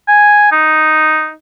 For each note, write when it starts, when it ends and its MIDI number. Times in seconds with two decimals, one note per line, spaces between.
0.08 0.51 80
0.52 1.31 63